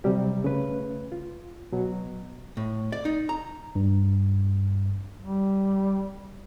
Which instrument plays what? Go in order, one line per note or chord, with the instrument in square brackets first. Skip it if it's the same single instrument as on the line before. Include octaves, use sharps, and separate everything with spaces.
[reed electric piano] C3 F#3 G3 G4
C#3 A3 C#4 B4
F4
B2 F#3
[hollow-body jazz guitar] A2
D5
D#4
A#5
[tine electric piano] G2
[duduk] G3